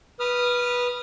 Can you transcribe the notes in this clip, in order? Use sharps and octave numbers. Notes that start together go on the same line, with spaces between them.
B4 D#6 F6